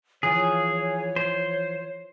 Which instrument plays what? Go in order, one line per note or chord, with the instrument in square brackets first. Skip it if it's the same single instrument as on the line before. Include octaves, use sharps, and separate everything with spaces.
[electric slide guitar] E3 F3 F4 [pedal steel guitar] G#4 [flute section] C#5
[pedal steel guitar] C5